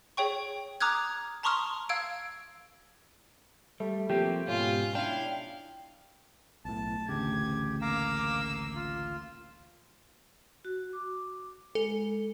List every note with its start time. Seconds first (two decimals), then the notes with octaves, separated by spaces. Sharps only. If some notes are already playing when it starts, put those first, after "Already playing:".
0.17 G#4 C#5 G5 C#6
0.81 A#5 D6 D#6 F6 F#6 G#6
1.43 A5 A#5 C6 C#6 D#6 F6
1.89 F5 E6 G#6 D7
3.80 G3 A3
4.10 F3 A#3 C4 G4
4.48 G#2 B2 C#4 F4
4.95 D4 E4 F5 G5
6.65 B1 A2 A5
7.09 A1 D2 C#3 G4 G#6
7.82 A#3 F5 A#5 D6 E6
8.75 F4
10.65 F#4
10.93 D6
11.75 G#3 A4